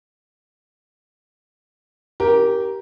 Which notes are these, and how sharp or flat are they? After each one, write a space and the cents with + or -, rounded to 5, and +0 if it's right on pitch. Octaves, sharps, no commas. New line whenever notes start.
C#4 +0 G4 -15 A#4 +10